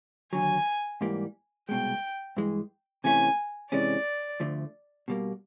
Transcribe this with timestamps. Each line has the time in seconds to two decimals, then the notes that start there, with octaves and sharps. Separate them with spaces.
0.33 D#2 D3 F#3 G#5
1.01 G#2 E3 G3 A#3
1.69 C2 B2 G#3 G5
2.37 G2 E3 G#3
3.04 C3 E3 A3 C#4 G#5
3.72 C3 E3 G#3 C#4 D5
4.40 D2 D3 F3 A3
5.08 B2 G3 A#3